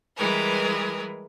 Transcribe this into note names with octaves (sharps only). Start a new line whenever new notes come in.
E3 G3 G#3 A#4 B4